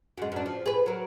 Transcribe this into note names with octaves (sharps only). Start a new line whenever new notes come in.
F#2 G#3
F#2 D4
F3
G#4 B4
F#3 A#4